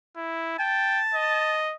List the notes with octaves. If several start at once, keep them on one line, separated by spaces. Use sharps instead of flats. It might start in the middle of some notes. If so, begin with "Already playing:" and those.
E4
G5 A5
D#5